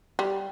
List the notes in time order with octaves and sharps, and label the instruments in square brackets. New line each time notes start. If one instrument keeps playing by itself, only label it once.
[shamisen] G3